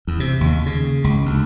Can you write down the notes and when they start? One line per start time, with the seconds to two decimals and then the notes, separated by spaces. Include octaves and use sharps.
0.07 E2
0.20 C3
0.41 D#2
0.66 C#3
1.04 C#2
1.26 D2